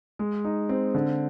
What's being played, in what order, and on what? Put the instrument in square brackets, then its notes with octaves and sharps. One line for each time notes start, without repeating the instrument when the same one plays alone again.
[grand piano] G#3
D#4
C4
D3